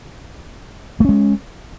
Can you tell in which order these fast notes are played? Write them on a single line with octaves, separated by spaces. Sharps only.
A3 C#4 G#3